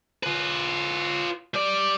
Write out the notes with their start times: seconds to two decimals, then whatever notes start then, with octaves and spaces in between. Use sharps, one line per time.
0.23 F4 B4
1.54 G3 D5